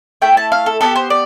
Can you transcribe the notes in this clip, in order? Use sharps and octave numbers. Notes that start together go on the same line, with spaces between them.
A3 E4 A4 G5
A5
F5
A4
B3 D4 G4 A4
C5
D5